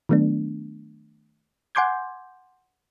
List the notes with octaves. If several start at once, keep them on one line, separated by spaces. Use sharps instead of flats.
D#3 F#3 A3 B3 D4
F#5 G#5 C6 D6 G6 G#6